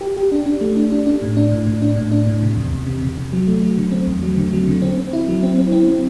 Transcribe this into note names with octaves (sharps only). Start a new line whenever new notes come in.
G4
G4
D4
D4
A3
D4
D4
D4
A2
D4
A2
A2
D4
A2
D4
A2
C3
E2
E2
C3
C3
C3
F#3
A3
F#3
D3
C4
E2
F#3
D3
F#3
D3
C4
C4
E4
F#3
C4
C4
C4
C4